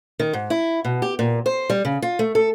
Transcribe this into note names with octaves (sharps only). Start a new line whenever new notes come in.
D#3
G#2
E4
B2
G4
A#2
C5
G3
C#3
F4
A3
A4